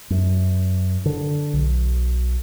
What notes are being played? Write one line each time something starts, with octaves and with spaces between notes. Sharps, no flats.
F#2
D3
B1